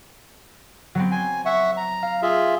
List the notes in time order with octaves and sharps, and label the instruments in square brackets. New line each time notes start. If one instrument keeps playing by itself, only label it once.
[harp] F#3 B3 C4
[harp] C5 [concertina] G#5
[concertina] E5 F#5 C#6
A#5
[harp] F5
[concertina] F4 G#4 E5